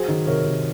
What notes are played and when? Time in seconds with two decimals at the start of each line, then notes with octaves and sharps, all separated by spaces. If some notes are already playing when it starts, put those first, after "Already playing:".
Already playing: F#3 G#4 C5
0.08 D#3
0.27 C3 A#4 C#5
0.46 C3